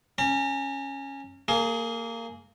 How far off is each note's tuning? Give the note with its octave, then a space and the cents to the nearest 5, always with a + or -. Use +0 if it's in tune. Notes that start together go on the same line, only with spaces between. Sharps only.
C#4 -10 A#5 -45
A#3 -20 G#4 +20